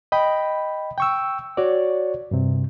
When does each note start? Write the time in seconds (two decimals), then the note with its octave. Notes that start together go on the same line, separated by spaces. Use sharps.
0.12 D#5 G5 B5
0.98 G5 C#6 E6
1.57 F#4 C#5 D5
2.31 G2 C3